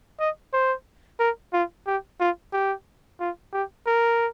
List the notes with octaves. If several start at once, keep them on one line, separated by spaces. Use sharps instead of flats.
D#5
C5
A#4
F4
G4
F4
G4
F4
G4
A#4